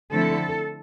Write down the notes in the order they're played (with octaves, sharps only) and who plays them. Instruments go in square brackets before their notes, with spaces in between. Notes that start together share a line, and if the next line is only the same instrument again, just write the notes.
[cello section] D3 F3 A3 C4 E4 A4